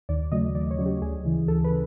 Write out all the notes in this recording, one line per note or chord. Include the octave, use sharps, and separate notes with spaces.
D#2 D5
C#3 F#3 A3 D#5
D#2 D5
C#5
C#3 F#3 A3
G4
D2 G#4
C#3 E3
D2 A4
B4
C#3